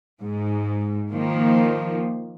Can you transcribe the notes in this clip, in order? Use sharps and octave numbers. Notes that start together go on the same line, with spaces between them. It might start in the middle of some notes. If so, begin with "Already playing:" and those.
G#2
D#3 F3 A#3